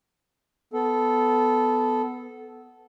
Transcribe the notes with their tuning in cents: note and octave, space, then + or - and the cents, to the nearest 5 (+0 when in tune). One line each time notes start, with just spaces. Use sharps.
B3 +10 A4 -10